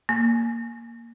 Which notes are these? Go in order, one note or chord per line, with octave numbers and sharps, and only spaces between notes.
A#3